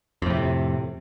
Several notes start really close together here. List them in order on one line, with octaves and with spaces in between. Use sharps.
F2 A2 C3